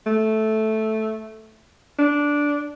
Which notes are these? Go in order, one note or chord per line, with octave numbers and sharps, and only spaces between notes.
A3
D4